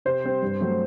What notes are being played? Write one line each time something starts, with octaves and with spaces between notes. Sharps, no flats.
C3 C5
G3 C4
G2
F#3 A3 C4